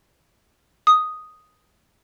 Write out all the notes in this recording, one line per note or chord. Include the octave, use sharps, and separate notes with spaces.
D#6